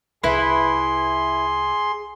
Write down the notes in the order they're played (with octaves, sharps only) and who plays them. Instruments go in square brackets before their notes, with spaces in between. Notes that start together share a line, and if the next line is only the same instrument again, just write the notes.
[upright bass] C2 [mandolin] E4 B4 B5 [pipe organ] G#4 C6